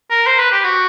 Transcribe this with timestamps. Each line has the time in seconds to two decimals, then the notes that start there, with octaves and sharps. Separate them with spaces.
0.11 A#4
0.27 C5
0.39 B4
0.52 G4
0.64 F#4